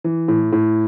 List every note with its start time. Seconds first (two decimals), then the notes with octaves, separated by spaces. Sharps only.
0.04 E3
0.28 A2
0.53 A2